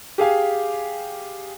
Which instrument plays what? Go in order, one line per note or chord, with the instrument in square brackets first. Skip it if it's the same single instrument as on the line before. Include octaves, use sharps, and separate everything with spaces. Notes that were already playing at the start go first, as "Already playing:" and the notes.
[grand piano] G4 G#4 F5 G#5